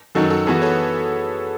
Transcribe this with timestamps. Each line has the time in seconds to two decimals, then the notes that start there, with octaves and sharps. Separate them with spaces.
0.15 F#2 D#3 F#3 F#4 A4
0.30 F#4 A4
0.47 E3 B3 F#4 G#4 B4
0.62 A4 C#5